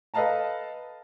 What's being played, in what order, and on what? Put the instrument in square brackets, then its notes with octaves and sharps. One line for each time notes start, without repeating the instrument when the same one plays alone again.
[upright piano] A4 B4 D#5 F5 A5 A#5